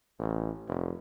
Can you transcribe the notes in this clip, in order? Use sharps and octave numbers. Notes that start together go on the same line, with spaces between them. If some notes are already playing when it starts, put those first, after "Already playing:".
A1
F1